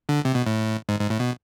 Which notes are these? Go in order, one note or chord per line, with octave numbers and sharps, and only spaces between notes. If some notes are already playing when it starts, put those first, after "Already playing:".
D3
C3
B2
A2
G#2
G#2
A2
B2